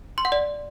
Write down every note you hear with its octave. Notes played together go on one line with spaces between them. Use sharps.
C6
F#5
D5